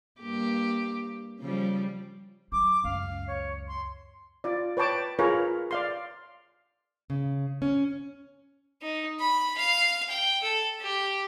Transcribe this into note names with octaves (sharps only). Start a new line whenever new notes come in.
G2 A#3 G4
C#3 F3 G3
F#3 D6
C#2 F#2 F5
C#5
C6
F4 D5
B4 C#5 G5 A5 D6
F4 G#4 A#4 B4 C#5
D5 F5 C6
C#3
C#4
D#4
B5
F5
G5
A4
G4